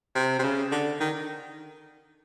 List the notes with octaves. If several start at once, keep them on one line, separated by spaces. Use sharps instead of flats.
C3
C3
C#3
D3
D#3